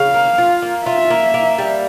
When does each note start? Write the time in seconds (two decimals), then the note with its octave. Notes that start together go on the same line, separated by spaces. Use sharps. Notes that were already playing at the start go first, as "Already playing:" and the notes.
Already playing: C#3 F5
0.14 A#3
0.38 F4
0.62 A#3
0.86 F4 E5
1.10 A#3
1.34 A#3
1.58 G3